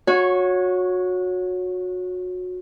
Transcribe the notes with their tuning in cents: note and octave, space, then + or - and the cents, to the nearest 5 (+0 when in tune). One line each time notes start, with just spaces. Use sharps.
F#4 -25 C#5 +0